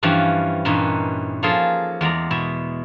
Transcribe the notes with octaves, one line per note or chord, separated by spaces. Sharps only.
G2 E3 F3 G3 C#4 B5
G2 A#2 E3 C#4 D#4 B4
F3 A#3 F4 G#4 A4
E2 G#3 D5 A#5
B2 E4 E5